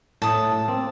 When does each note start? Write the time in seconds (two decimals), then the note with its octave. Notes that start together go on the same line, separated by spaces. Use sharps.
0.22 A2 A5 D#6
0.68 A#3 C4